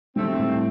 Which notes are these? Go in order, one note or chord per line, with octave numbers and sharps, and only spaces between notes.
G3 A3 C4
A2